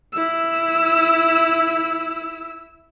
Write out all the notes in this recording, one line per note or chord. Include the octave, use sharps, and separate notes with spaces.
E4 E6